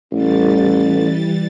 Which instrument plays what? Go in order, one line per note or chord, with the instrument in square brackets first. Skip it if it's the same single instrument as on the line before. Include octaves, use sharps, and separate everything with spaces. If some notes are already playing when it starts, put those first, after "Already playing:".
[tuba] A1 [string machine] E3 G3 A6